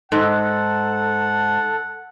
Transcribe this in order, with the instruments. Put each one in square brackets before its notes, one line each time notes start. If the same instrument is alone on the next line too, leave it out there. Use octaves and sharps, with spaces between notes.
[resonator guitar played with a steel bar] G#2 [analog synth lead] A4 [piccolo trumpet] F#5